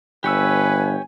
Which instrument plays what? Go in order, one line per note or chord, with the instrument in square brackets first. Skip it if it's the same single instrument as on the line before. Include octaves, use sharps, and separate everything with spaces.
[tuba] G1 [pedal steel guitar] G4 C#5 E6 [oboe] B4 [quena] G#5